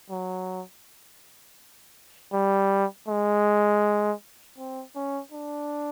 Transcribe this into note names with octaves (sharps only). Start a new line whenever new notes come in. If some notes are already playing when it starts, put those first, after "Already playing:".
F#3
G3
G#3
C4
C#4
D4